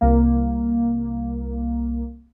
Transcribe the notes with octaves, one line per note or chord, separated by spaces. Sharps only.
C2 A#3